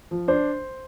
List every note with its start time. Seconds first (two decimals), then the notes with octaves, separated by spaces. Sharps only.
0.11 F3
0.28 D4 C5